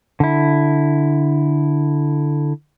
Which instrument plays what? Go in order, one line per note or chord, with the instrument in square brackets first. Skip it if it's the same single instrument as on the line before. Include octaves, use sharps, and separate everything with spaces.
[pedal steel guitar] D3 E4